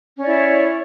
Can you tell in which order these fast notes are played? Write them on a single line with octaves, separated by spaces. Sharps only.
C#4 D5 E4 C#5